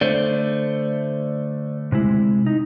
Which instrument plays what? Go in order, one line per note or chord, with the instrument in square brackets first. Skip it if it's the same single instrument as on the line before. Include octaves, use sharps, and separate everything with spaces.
[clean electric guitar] D3 A3 [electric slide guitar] C5 D5
[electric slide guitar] C3 G#3 E4
D#4